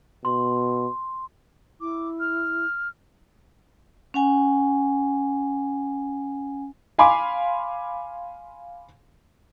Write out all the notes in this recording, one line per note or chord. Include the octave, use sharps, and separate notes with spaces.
B2 C6
E4 D6
F6
C#4 F#5 G#5
F5 G#5 B5 C6 D6